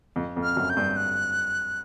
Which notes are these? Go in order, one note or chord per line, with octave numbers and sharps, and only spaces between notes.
F2
F2
F6
F#2
G6
G2
F#6